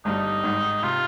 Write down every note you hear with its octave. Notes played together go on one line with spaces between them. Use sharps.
G1 G2 G3 D#4
G#1 G#2 D#3
C3 F4